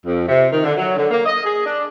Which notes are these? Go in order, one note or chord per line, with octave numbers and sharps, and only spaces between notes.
F2
C3
D#3
D3
F#3
D3
A#3
D#5
G#4
D4